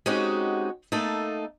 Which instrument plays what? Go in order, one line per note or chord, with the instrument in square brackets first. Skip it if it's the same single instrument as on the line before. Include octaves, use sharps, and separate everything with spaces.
[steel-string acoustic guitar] G#3 C4 C#4 D#4 F#4 G4
A3 A#3 D#4 A4